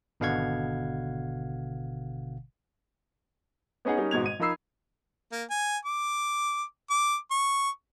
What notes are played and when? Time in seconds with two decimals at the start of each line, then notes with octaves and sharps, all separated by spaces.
0.20 G#1 B2 D3 F5 F#5 G#6
3.85 B3 C#4 D#4 G#4 F#5
3.97 G3 C#4 D#4 A#4
4.11 G#1 G#2 B2 G#6 F7
4.26 D#7
4.40 F3 D#4 A#4 B5 E6 C7
5.32 A#3
5.50 G#5
5.85 D6
6.90 D6
7.31 C#6